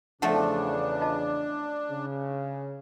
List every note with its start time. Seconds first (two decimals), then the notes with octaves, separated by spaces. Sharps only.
0.22 E2 C#3 F3 A3 D4 A4 E5 F#5
1.00 F4 D#5 A5
1.91 C#3